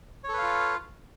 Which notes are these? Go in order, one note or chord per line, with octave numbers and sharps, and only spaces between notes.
F4 A4 B4 C#5 F5